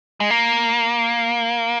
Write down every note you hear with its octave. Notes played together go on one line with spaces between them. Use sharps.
G#3
A#3